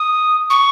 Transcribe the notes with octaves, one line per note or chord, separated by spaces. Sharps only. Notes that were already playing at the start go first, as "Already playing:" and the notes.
Already playing: D#6
C#6